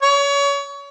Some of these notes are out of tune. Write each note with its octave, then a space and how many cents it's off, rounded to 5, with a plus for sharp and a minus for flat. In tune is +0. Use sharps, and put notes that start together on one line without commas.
C#5 +30